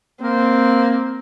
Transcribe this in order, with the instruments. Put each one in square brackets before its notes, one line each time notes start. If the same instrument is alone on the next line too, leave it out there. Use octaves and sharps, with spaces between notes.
[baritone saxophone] A#3 [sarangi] C4